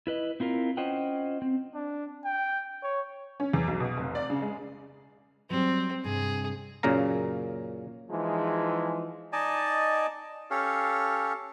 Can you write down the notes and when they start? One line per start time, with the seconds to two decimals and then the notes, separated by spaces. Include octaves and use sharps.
0.07 E4 B4 D#5
0.40 C4 E4 F4 A#4
0.77 C#4 F4 C5 D#5 F#5 G5
1.42 C4
1.74 D4
2.25 G5
2.82 C#5
3.40 C#4
3.53 E2
3.67 B1
3.80 B2
3.97 F1
4.15 D5
4.30 C#3
4.42 G#3
5.50 F#3 G3 C4
6.04 G2 C3 G#4
6.83 F#2 A#2 C#3 A#3 F5 A#5
8.10 E3 F3 G#3 D#4 G#4
9.33 D#4 D5 D#5 G#5 A5
10.51 C#4 G4 A4 C#5 F5